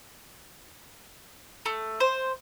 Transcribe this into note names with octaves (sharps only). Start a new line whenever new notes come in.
A3
C5